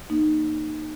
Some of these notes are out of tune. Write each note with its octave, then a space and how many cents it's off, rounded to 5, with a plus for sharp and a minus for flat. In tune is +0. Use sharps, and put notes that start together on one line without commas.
A#3 +0 D#4 -20